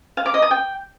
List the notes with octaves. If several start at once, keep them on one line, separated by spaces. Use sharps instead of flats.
F5
D6
D#5
D#6
G5